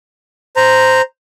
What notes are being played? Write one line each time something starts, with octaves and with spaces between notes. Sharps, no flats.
C5 A#5